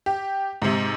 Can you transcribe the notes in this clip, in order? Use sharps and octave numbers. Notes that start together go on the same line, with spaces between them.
G4
G#2 C3